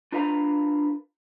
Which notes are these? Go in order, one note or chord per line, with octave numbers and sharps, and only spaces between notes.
D4 F4 A#4 B4 F5 A#5